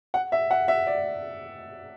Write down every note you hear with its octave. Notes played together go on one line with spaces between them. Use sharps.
F#5
E5
F#5
E5
D5